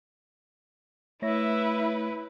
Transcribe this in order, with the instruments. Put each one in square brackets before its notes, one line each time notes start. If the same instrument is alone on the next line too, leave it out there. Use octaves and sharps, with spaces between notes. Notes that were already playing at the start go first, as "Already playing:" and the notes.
[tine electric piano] A3 C#5 A#6 [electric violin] E4 B4 [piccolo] E5